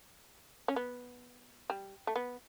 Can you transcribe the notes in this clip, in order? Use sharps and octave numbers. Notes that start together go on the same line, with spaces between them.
C#4
B3
G3
A3
B3